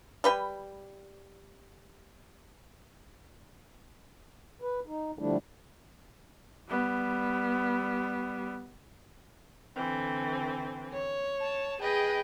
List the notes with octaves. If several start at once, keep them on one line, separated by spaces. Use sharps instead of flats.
G3 B4 G5
B4
D#4
D3 F3 G3 A3 D4 E4
G3 B3
D3 E3 C4
C#5
A5
G#4 B4 D#5 G5